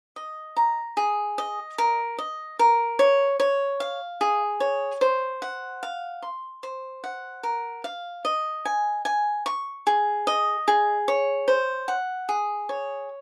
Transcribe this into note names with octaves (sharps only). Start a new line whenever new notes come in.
D#5
A#5
G#4
D#5
A#4
D#5
A#4
C#5
C#5
F5
G#4
C#5
C5
F#5
F5
C6
C5
F#5
A#4
F5
D#5
G#5
G#5
C#6
G#4
D#5
G#4
C#5
C5
F#5
G#4
C#5